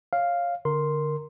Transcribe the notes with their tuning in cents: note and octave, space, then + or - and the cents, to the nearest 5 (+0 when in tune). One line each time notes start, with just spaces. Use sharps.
C#5 +0 F5 +0
D3 -5 A#4 +0 C6 +0